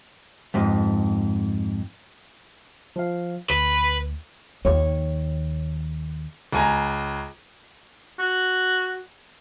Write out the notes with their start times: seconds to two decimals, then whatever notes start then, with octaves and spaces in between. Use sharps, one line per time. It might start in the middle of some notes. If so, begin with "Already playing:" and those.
0.54 F2 G#2
2.96 F3 F5
3.50 D2 B4
4.65 D#2 C#5
6.52 C#2 G#5 A#5
8.19 F#4